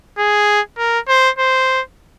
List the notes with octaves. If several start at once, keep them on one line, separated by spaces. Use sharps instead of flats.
G#4
A#4
C5
C5